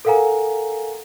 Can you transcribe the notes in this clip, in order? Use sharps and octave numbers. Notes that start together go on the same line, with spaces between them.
A4 A#4 F5 F#5 G#5 A#5